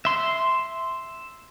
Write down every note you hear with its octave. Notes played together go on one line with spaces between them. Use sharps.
E5 C6